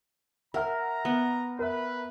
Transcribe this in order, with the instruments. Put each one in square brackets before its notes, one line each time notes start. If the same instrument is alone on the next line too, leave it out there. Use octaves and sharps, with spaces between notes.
[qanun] A#4 [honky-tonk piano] E5 F#5 F6 [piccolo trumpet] A#5
[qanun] B3
[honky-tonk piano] A#4 E5 [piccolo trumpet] B4